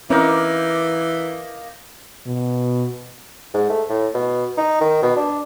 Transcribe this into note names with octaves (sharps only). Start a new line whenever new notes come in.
E3 A#3 C4 C#4 D#4 A#4
B2
G#2
A3
A2
B2
D#4
D#3
B2
D4